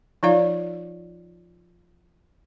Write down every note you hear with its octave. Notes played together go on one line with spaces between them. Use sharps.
F3 D#4 F4 D5 F5